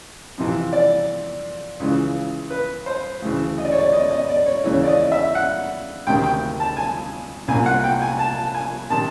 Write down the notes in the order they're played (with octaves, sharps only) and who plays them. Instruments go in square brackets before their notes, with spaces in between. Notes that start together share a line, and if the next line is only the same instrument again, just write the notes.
[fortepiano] F2 C3 E3
D5
C#2 C#3 E3
B4
C5
D2 C#3 E3
D#5
D5
C#5
D5
D#5
D#5
D5
C#5
D#2 C#3 E3 C#5
D5
D#5
E5
F#5
D2 C3 D#3 G5
G5
A5
G#5
C2 A#2 G#5
F#5
G5
G#5
A5
G#5
C3 D#3 A5